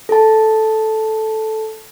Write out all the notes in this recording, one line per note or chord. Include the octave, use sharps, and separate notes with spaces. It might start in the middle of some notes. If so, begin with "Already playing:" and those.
A4 A5